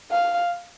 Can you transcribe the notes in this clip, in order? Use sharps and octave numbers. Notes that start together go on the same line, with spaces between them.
F5